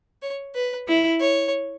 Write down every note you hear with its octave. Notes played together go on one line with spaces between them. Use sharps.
C#5
B4
E4
C#5